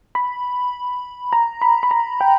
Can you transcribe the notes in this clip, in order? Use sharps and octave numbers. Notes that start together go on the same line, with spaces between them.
B5
A#5
B5
B5
A#5
G5